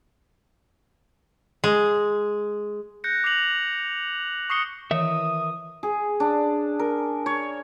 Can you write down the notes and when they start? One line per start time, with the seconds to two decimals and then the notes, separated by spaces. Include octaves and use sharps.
1.64 G#3
3.04 F#6 G6 A#6 C#7
3.24 D6 A#6 C7 F7 F#7
4.50 C#6 D#6 C7 C#7 G7
4.91 D#3 E3 A#4 C#5 E5 D#6
5.83 G#4
6.20 D4
6.79 A#4
7.26 C#5